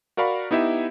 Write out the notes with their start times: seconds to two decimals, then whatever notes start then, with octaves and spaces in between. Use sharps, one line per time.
0.17 F#4 A#4 D5 F5 B5 C#6
0.51 B3 D#4 E4 G4 E5